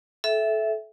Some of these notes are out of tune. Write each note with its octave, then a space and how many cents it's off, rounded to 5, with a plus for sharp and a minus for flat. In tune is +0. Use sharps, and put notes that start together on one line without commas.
A4 -25 E5 +0 G5 +0